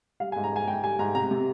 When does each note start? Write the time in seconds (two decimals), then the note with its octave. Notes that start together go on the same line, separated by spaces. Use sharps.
0.20 G3 F5
0.32 G#5
0.36 G#2
0.44 A#5
0.52 G#2 G#5
0.67 G#2 G5
0.83 G3 G#5
0.99 G#2 A#5
1.15 C3 A#5
1.31 C3